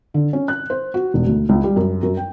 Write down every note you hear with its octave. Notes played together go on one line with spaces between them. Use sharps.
D3
C#4
F#6
C5
F#4
E1
D2
C#2
G3
F#2
F#2
G5